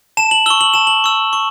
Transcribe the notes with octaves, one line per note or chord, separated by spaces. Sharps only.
A5 E7
F#7
C#6 E6 G7
F#7
A5 E7
F#7
C#6 E6
C#6